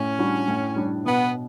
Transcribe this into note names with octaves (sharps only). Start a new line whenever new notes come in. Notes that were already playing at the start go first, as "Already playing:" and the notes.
Already playing: A2 C#4
G3 D4 F#4
A2
G3 D4
B2 B3